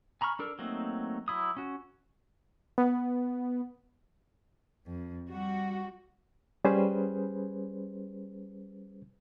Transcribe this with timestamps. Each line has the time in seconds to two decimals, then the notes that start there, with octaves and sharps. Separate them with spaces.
0.21 G#5 A#5 B5 C#6 F6
0.39 D4 A4 A#4
0.59 F#3 A3 A#3 C4 D#4
1.28 F#3 E4 D#6
1.57 C#4 F#4
2.78 B3
4.86 F2
5.30 G3 F#4
6.64 G3 C#4 G#4 B4 C5